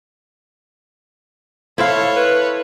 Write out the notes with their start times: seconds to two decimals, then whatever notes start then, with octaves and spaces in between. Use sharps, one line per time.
1.78 E4 A4 C5 C#5 F5
2.16 B4